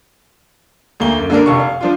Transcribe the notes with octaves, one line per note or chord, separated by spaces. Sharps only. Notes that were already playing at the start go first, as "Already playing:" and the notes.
D2 A#3 G7
F#2
D3 A#3 D4 A#4
F1 F5 C#6
F5
F3 D4 F4